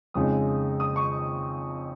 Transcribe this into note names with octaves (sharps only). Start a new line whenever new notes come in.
F2 C#3 G#3 D#4 D#6
D#6
C#6